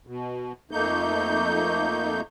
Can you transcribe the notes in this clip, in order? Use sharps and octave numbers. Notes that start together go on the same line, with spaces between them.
B2
F2 A3 A#3 D#4 G6